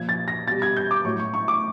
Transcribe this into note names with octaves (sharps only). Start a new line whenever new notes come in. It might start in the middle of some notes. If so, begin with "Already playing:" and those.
Already playing: A#2 F3 G#6
A6
A#6
B2 G3 A6
G#6
G6
D6
A2 F#3 C#6
C#6
C#6
D6